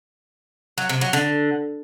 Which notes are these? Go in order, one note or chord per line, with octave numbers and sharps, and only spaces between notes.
F#3
C3
F#3
D3